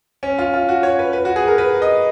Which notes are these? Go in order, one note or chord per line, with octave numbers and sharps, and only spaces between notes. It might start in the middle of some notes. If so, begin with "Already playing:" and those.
C#4
F4
F4
F#4
C#5
B4
B4
F#4
G#4
A#4
B4
D#5